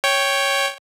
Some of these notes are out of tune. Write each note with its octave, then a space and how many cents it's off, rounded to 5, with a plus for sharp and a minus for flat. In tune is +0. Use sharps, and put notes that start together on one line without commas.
C#5 +0 G5 +0